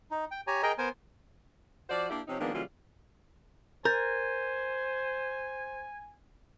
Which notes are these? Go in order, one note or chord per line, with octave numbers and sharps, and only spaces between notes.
D#4
G5
G4 C#5 G#5 A#5
G#4 A#4 D#5 G5 A#5
B3 A#4 C5 G#5
F3 F#4 C5 D5
A#3 D4 E4 G4
C3 F3 C4 C#4 D#4
D#3 F3 G#3 A#3 B3 D4
C#3 E3 F#3 G3 A#3 F4
A#4 C5 G#5 G6 A6